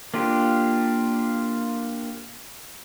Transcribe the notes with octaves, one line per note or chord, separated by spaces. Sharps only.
A#3 D4 F4 G4